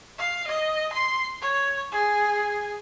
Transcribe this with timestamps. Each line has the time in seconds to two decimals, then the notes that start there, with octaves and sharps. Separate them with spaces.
0.19 F5
0.47 D#5
0.93 C6
1.42 C#5
1.92 G#4